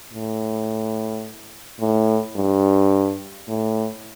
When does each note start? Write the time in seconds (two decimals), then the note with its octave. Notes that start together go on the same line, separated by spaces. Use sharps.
0.13 A2
1.80 A2
2.36 G2
3.48 A2